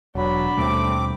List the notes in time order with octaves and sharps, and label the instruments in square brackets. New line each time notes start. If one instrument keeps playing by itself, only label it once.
[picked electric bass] E1 [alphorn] F#3 [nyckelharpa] D4 B5
[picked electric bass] D#2 B2 G3 [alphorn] A3 [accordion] C4 D6